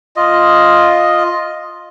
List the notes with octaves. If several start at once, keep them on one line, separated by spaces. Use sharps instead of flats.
F4 D#5